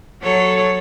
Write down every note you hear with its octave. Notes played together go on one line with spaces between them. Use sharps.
F#3 A4 C#5